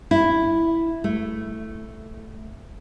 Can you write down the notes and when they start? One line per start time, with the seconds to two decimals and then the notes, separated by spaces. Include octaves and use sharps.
0.11 E4
1.04 A3